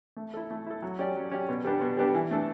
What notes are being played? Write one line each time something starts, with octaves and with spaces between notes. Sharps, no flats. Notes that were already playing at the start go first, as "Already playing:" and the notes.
A3
E4 A4
A3
E4 A4
F#3
C#4 G4 D5
F#3
C#4 G4 D5
B2
G3 B3 D4 G4
B2
G3 B3 D4 G4
E3
A3 D4 A4